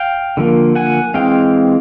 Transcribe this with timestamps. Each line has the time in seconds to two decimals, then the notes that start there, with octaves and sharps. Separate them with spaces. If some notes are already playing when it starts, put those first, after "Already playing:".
Already playing: F5 G5
0.37 D3 F3 A#3
0.75 F#5 G#5
1.14 E3 G#3 C4 F5 G5